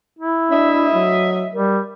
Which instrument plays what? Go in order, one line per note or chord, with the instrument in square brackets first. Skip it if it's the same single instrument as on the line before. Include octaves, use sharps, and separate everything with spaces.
[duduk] E4
[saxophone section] D2 D#5 E5 [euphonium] D4
[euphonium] F#3
[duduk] G3 [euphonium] A#4